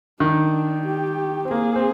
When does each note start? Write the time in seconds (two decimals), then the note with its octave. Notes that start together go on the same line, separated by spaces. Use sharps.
0.20 D#3 D4
0.86 G4
1.45 C4
1.51 A#3 G#4
1.76 C4